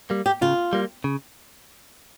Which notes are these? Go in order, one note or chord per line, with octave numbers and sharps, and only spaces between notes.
G3 A#3
G4
C#3 F4
G3 A#3
C#3